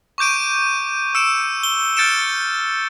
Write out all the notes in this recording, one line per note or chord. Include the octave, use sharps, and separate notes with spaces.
C#6 D6 G6 D7 D#7
E6 C#7 D7 E7
G7
F6 G6 A6 C#7 D7 E7